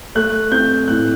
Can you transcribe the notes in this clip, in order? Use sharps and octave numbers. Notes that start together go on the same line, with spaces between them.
A3 F#6
C4 G6
A2 F#6